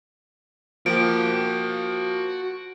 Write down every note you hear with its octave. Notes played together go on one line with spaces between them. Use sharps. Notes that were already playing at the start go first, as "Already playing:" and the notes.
F3 A#3 F#4 G5 D7